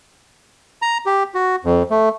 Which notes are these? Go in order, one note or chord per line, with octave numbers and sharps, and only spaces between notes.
A#5
G4
F#4
F2
A3